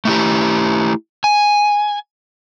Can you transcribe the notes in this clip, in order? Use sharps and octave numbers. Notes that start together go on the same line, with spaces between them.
A3 E4 G4
G#5